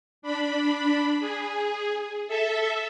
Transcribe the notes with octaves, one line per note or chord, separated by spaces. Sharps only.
D4 B5
G#4
A4 E5